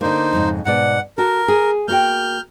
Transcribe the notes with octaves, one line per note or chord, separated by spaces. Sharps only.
D3 A#3 D#4 C5
F2 G#2 C#3
G#2 B2 D5 F#5
F#4 A4 A#4
G#4
A#3 F#4 G5 F6 G6